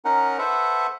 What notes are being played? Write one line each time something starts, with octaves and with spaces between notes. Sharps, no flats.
C#4 D#4 A#4 F#5
A4 B4 C5 E5 F#5